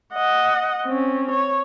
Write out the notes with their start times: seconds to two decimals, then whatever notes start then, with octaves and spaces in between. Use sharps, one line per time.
0.14 D#5 F#5
0.85 C4 C#4
1.31 C#5